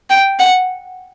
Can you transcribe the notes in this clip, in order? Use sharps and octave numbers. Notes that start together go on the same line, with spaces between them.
G5
F#5